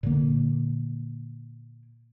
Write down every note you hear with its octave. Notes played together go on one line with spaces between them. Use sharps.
A#2 D3 A#3